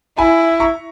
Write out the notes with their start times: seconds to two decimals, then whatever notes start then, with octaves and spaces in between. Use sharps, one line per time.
0.18 E4 G#5 B5
0.60 A#5 C#6